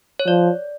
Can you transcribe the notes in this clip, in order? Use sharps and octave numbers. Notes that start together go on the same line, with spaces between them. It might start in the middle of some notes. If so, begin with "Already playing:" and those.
C#5
F3 D5